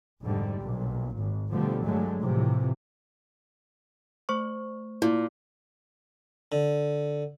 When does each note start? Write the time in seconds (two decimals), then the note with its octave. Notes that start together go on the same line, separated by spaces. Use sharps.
0.23 F1 G#2 D3 G3
0.61 B1 A#2
1.18 G#1
1.52 B2 D3 F3 G3 A3
1.85 G2 D3 F#3 G#3 A3
2.22 A2 C3 E3 F3
4.29 A3 C5 C#6
5.02 A#2 E4
6.52 D3